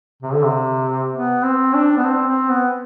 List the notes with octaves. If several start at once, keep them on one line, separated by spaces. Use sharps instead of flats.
C3
D3
C3
B3
C4
D4
B3
C4
C4
B3